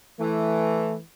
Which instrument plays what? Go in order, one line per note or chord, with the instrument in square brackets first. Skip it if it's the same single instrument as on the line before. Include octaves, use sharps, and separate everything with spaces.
[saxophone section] E3 [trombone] A3